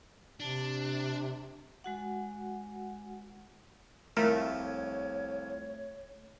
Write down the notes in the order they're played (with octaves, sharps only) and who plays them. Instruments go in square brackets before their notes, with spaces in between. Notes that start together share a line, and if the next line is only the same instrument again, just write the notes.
[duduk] C3 [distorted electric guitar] D4
[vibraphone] G#3 F#4 F#5
[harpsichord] C2 F3 [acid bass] A3 [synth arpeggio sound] A#4 [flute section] C#5